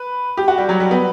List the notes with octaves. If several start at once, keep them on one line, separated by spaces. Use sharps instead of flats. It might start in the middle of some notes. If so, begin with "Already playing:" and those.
Already playing: B4
G4
F#4
G3
F#3
G3
B3